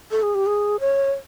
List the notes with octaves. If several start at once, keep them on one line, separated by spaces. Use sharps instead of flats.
A4
G#4
G4
G#4
C#5